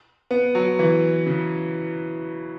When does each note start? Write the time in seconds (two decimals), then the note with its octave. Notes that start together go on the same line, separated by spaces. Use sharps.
0.31 B3
0.55 F#3
0.79 E3
1.26 C#3